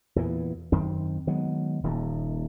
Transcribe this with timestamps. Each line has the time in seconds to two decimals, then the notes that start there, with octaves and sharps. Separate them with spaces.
0.16 E2 A#2 E3
0.72 F#2 D#3 C4
1.27 D#3 F#3 G#3 B3
1.83 D#1 D#2 A#2